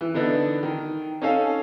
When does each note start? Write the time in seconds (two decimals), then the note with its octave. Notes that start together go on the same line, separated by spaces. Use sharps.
0.01 E3
0.14 D3 B3 D4 D#4
0.63 D#3
1.22 C#4 D#4 A4 F5 G#5